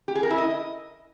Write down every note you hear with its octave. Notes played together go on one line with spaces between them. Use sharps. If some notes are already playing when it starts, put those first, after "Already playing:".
G4
G#4
A#4
E4
D#5